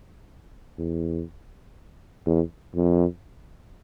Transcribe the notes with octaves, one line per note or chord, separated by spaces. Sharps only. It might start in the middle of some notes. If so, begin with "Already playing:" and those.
E2
E2
F2